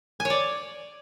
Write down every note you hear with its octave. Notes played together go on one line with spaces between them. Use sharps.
G#5
C#5
D5